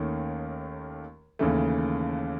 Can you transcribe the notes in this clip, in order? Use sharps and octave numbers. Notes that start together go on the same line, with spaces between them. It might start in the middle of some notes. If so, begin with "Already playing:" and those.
Already playing: D#2 D#3 A3 C#4
D#2 C#3 E3 A3